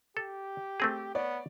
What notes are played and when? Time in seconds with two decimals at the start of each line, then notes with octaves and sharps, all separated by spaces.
0.17 G4 A4
0.80 A3 C4 G#4
1.15 B3 C#5 D5